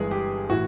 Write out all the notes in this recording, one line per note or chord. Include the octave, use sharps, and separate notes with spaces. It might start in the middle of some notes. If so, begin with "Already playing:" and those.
Already playing: G1 G2 E3 G#3 G#4
G4
A2 E3 F#4